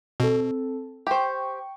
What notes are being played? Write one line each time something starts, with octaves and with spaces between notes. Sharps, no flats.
B2 C4 A4
G4 C5 G5 C#6